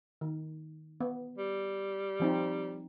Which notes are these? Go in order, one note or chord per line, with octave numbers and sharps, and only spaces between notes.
D#3
B3
G3
F3 C4 D#4